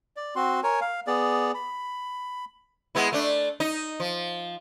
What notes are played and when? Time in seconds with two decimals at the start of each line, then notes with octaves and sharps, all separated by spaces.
0.16 D5
0.36 C4 F#4 C6
0.63 A#4 C#5 G#5
0.81 F5
1.07 B3 G#4 D5
1.55 B5
2.95 G#3 B3 E4
3.13 A3 D4
3.60 D#4
4.00 F3